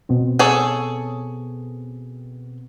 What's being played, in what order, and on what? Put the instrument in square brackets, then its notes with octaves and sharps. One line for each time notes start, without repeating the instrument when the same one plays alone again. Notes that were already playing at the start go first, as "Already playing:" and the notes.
[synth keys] B2 B3 C4
[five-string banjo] G#4 A4 C#5